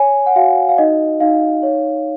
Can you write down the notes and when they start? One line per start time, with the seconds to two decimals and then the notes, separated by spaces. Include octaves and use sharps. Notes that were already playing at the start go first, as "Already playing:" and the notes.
Already playing: C#5 G#5
0.26 F#5
0.36 F#4 F5
0.69 F5
0.78 D#4 D#5
1.20 D#4 F5
1.63 C#5